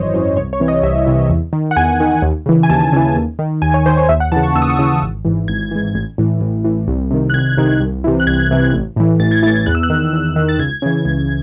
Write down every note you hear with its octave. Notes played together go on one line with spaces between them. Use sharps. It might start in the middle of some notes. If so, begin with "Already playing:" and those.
Already playing: G#1 F#2 E3 C5 C#5 D#5
F#2 E3
C2 C#5
C#5
C3 E3
D#5
C2 E5
C3 E3
E2
D#3
F#5
E2 G#5
D#3
D#2
C#3 E3
G#5
D#2 A5
C#3 E3
D#2
D#3
D#2 G#5
C#5
D#3 C5
C#5
D#2 E5
F#5
C#3 E3 A5
C#6
D#2 E6
D#6
C#6
C#3 E3 D#6
G#1
G#2 E3
G#1 G#6
G#2 E3
A1
A2 E3
A1
A2 E3
C2
C3 D#3
F#6
C2 G#6
C3 D#3
C2
C3 E3
F#6
C2 G#6
C3 E3
A1
A2 E3
A1 A6
G#6
A2 E3 A6
E2 F#6
E6
F#6
D#3
E2
D#3
A6
C#2 G#6
C#3 E3
C#2